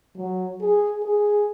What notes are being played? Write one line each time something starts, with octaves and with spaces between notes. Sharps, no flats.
F#3
G#4
G#4